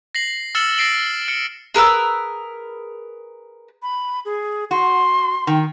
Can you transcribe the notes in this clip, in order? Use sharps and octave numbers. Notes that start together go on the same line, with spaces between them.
A#6 C7 F#7
E6 F6 A6 C#7 E7 F#7
E6 A6 A#6 C7 D7 F#7
F6 C#7 D7
G#4 A#4 B4 E6
B5
G#4
F#4 C6
D#3 G5